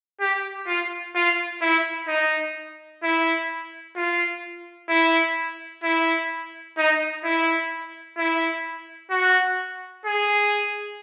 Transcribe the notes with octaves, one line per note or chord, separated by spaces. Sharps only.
G4
F4
F4
E4
D#4
E4
F4
E4
E4
D#4
E4
E4
F#4
G#4